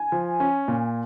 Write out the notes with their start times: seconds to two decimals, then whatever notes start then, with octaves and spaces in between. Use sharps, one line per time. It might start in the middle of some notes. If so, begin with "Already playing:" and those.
Already playing: G#5
0.12 F3
0.40 C#4
0.68 A#2